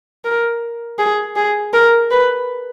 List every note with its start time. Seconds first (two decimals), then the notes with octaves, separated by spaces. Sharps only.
0.24 A#4
0.99 G#4
1.36 G#4
1.74 A#4
2.11 B4